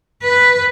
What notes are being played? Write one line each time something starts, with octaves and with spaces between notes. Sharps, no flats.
B4